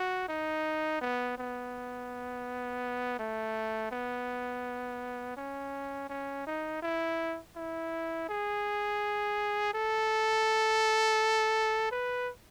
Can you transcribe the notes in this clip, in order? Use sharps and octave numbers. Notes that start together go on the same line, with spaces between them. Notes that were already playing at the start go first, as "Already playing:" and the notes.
Already playing: F#4
D#4
B3
B3
A3
B3
C#4
C#4
D#4
E4
E4
G#4
A4
B4